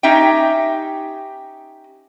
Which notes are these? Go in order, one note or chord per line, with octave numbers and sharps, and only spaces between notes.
C#4 D#4 G4 E5 G5